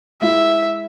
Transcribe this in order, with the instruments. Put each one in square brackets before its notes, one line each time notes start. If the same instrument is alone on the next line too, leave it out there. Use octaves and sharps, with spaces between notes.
[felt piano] G#3 E4 [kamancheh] E5